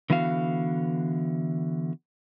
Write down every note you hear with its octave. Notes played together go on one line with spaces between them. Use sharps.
D3 E3 B3 F#4 F5